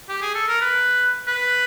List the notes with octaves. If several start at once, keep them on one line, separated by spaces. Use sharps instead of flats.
G4
G#4
A4
A#4
B4
B4